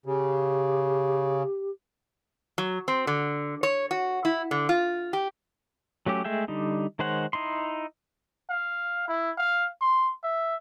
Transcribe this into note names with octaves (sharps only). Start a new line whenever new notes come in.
C#3 G4
F#3
C4
D3
C#5
F#4
E4
D3
F4
G4
F#3 A3 C#4 G4
G#3 A3 G#4 E5 G5
D3 G3 D#4
D#3 G#3 C5 C#5 F#5
D#4 E4 C6
F5
E4
F5
C6
E5